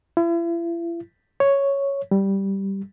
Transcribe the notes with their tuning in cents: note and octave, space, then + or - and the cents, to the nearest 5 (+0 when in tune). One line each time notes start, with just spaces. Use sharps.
E4 +40
C#5 +0
G3 -5